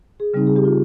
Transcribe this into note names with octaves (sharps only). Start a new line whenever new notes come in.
G#4
C#3 G3 C4 D#4
G#4
G4
F4